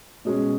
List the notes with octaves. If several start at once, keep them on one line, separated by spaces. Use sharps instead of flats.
B2 G#3 C#4